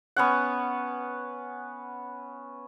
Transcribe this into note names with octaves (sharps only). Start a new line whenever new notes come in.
B3 C#4 F#5